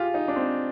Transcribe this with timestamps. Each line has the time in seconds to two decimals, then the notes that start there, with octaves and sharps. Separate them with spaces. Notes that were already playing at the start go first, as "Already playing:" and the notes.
Already playing: F4 G4 G#4
0.14 D#4
0.28 D4
0.36 C4